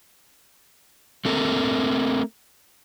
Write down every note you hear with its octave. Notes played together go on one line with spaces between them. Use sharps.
A3 C4 A4 A#4